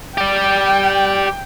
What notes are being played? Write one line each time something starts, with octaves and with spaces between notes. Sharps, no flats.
G4 D5 G5